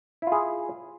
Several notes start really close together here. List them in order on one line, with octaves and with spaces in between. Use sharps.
E4 F4 G#4